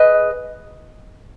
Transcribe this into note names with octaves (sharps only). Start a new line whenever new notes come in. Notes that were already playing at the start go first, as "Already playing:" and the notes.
Already playing: G#4 B4 D#5